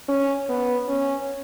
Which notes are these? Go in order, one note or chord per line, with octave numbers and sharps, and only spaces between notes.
C#4
B3
C#4